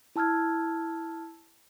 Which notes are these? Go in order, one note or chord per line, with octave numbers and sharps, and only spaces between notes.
E4 A5 E6 F6 G#6